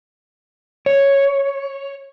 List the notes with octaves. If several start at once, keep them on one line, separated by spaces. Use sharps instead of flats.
C#5